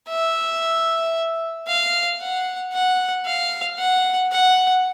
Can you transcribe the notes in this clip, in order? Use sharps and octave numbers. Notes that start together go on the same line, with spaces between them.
E5
F5
F#5
F#5
F5
F#5
F#5